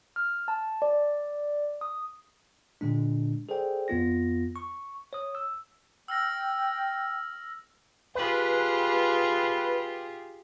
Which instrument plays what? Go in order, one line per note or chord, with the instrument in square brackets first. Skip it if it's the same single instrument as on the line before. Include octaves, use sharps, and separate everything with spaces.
[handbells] F6
A5
D5
D#6
[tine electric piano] A#2 D3 G#3 D4
G#4 A4 C5 D5 G5
F2 B3 F4 A#6
C#6
C#5 D#6
E6
[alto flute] G5 [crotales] E6 F6 A#6
[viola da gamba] F4 G4 G#4 [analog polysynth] B4